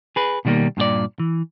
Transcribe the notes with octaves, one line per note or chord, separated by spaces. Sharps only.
G#4 B4
B2 D#3 G3 G#3 A#3
G2 A#2 G4 D5
E3